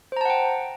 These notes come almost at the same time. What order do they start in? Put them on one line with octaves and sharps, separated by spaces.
C5 A#5 A5 F#5 G5